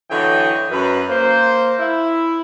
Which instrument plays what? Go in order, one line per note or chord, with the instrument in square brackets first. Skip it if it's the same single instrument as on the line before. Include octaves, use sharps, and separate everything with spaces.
[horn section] D3 E3 F#3 C#5 D#5 G5
F#2 B4
A#3 C5
E4